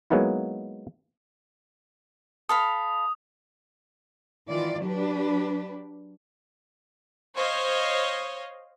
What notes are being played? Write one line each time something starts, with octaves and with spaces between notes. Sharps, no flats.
F#3 G#3 A#3 B3 D#4 E4
A4 F5 B5 D#6
D#3 E3 F4 D5
F#3 D4 G4 B4
C5 C#5 D#5 F5